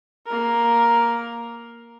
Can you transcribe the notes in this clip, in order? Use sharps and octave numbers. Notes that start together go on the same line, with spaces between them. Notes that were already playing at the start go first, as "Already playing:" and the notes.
A#3 A#4